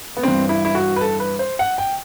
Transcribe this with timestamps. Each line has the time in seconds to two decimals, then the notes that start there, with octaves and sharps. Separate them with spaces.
0.17 B3
0.23 G2 E3 C4
0.49 E4
0.65 E4
0.75 F#4
0.96 B4
1.01 A4
1.20 B4
1.39 C5
1.59 F#5
1.78 G5